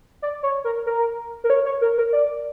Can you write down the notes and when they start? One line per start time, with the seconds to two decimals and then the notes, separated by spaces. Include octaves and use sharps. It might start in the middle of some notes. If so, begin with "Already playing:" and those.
0.22 D5
0.43 C#5
0.64 A#4
0.86 A#4
1.44 A#4
1.50 C#5
1.65 C#5
1.81 A#4
1.98 A#4
2.13 D5